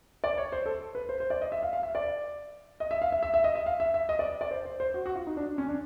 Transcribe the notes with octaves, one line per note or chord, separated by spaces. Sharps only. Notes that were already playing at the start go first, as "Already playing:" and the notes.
D5
C#5
C5
A4
B4
C5
C5
D5
D#5
E5
F5
F5
E5
D5
D#5
E5
F5
E5
E5
E5
D#5
E5
F5
E5
E5
D#5
D5
D5
C5
C5
C5
F#4
F#4
F4
D#4
D4
C#4
D4